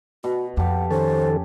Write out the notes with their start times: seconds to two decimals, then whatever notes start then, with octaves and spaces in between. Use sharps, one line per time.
0.24 B2 F#4
0.57 F2 G4 A4 F5 F#5
0.91 D#3 C#4 A4 C5